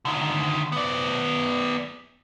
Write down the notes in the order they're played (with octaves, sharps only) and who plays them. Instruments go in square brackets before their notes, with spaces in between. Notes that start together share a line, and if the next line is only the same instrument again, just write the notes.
[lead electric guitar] D3 D#3
B3 D5